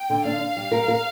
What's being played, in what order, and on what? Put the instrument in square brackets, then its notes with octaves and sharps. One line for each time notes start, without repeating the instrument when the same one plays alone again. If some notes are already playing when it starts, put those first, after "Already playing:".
Already playing: [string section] G5
[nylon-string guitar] D3
[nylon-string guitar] D4 [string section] F5
[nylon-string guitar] D4
G3
A#4
A#4